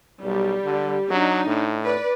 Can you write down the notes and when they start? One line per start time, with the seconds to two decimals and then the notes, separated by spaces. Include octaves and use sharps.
0.24 B1 G3
0.64 D3
1.10 F#3 D4 D#4
1.47 A2
1.83 B4 D5